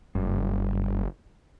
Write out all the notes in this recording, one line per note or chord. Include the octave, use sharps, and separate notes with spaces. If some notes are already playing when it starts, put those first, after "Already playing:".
F#1 G2